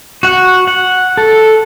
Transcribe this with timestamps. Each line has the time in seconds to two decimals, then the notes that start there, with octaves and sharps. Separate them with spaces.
0.23 F#4 F#5
0.67 F#5
1.17 A4